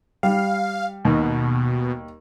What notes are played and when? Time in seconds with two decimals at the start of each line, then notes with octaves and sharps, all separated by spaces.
0.23 G3 F5
1.05 D#2 B2